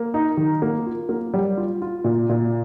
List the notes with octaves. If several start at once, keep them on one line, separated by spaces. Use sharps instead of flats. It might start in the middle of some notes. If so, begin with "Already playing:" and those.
Already playing: A#3
D#4
D#3
A#3
F4
A#3
G3
F4
F4
A#2
A#2